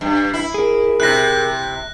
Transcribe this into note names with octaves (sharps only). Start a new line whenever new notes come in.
G2
E4
G#4 A#4
C3 E4 F#6 A#6